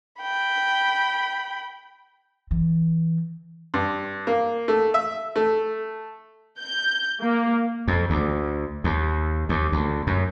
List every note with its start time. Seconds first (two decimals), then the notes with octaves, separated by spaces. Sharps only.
0.22 G5 B5
2.51 E3
3.74 G2
4.27 A#3
4.68 A3
4.94 E5
5.36 A3
6.59 G6
7.20 A#3
7.88 F2
8.10 D2
8.84 D#2
9.49 D#2
9.72 D2
10.07 F#2